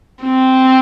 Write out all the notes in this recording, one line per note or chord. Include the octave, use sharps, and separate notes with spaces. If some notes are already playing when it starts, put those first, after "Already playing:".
C4